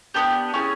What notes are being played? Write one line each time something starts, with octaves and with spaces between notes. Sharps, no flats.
B3 D4 G4
C#4 E4 G#4